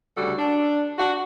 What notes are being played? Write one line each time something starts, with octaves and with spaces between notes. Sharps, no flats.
D2 C#3 G3 F#4 A4
D4
D4 F#4